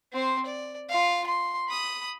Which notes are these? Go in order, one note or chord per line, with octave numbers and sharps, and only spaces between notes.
C4 C5
D5
F4 F5
C6
B5 D#6